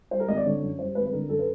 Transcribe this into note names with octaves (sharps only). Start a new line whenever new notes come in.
G3 C5
A#4
G#1 D#5
D5
D3 C#5
F#2
G3 C5
G#1 B4
B4
D3 A#4
F#2 A4
B4